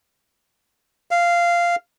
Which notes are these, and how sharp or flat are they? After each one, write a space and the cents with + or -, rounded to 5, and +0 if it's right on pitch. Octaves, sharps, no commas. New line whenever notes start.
F5 -10